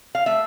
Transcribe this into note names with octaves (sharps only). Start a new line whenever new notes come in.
F5
A3 E5